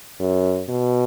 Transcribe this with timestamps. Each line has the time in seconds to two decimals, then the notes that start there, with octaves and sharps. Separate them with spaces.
0.20 F#2
0.69 B2